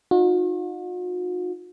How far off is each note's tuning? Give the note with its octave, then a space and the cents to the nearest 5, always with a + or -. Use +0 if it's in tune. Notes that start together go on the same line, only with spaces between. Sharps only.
D#4 +0 F#4 -45